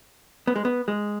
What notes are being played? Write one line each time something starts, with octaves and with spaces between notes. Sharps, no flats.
B3
G#3
B3
G#3